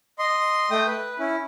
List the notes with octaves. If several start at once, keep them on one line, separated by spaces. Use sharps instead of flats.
D#5 C6
A3 G5 D#6
B4
C#4 E4